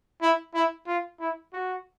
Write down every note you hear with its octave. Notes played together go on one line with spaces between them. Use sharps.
E4
E4
F4
E4
F#4